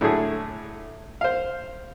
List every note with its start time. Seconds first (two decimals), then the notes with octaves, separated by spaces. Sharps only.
0.01 A2 D3 F#3 A3 G#4
1.21 C5 F5